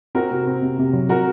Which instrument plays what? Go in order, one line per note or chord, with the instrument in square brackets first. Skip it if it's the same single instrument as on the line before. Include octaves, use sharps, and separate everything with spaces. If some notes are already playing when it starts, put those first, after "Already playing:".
[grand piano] C4 [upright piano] F#4 A#4
[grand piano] C3
C4
C3
C3
F#3
[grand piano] F#3 [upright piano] F#4 A#4